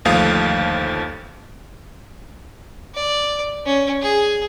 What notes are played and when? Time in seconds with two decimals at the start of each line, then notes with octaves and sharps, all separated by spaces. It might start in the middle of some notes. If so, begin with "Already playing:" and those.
0.05 G1 D#2 F3 A3 F5 D#6
2.95 D5
3.66 C#4
4.02 G#4